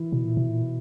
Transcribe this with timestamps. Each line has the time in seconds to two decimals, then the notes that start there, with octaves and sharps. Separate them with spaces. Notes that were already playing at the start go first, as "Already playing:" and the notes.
Already playing: E3 E4
0.12 B2
0.24 A#2
0.37 B2
0.50 A#2
0.62 B2